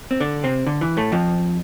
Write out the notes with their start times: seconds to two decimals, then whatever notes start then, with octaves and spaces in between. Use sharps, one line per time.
0.11 C4
0.20 D3 D4
0.44 C3 C4
0.66 D3
0.81 E3
0.97 A2 A3
1.12 F2 F3